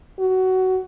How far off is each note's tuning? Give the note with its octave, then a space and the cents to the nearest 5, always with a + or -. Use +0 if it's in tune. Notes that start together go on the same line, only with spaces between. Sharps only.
F#4 +15